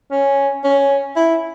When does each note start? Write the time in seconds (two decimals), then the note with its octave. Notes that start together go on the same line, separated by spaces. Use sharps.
0.11 C#4
0.64 C#4
1.16 E4